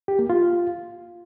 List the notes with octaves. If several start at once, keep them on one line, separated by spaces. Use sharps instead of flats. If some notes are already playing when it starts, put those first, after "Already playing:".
G4
A#3
F4